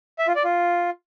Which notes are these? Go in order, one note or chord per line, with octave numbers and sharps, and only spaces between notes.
E5
F4
D5
F4